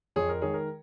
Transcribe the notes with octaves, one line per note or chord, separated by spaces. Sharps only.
F2 G#4 C#5
A#4
D#3 G#3 G#4 C#5
A#4